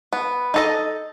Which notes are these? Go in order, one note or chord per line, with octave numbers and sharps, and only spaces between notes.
B3
D#4 A4 D#5